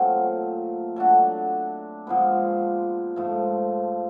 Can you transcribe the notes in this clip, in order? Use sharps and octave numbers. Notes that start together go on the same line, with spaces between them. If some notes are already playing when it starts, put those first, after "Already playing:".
Already playing: A#2 F#3 A3 C4
F#3 A3 D4 F#4
A#2 F3 G#3 B3
G#2 F3 A3